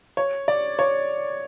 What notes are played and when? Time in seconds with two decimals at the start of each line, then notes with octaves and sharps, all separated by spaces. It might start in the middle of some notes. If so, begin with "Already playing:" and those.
0.17 C#5
0.48 D5
0.79 C#5